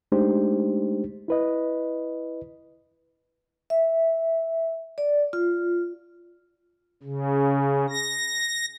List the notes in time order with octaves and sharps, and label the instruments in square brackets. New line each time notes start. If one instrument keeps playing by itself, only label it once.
[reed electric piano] G#3 A3 D4 D#4 G4 C5
E4 B4 D#5
[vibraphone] E5
D5
F4
[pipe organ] C#3
A#6